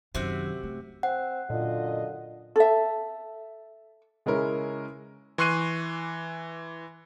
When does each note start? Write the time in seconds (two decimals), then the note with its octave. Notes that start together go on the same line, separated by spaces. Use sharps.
0.15 F#2 C3 D#3 F#4 E5
0.63 A3
1.03 C4 F#5
1.50 F#2 A#2 D3 F4 D#5
2.56 A4 E5
4.26 C#3 G#3 C#4 E4 A#4
5.38 E3 C6 C#6 F#6 C7 D#7